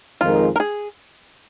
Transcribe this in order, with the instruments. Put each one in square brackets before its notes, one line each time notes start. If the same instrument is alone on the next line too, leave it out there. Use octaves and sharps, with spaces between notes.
[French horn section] F2 D#3 G#3 D#4 A#4 [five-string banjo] F4
[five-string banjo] A#4
G#4